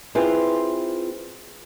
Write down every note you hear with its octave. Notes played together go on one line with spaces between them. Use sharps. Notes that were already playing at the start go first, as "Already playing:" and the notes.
C4 E4 F4 G#4 B4 C5